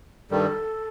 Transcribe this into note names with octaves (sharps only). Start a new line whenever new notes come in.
G2 D#3 G3 A4